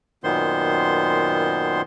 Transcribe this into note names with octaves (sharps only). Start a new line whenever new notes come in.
F#2 A#2 D#3 B3 C5 C6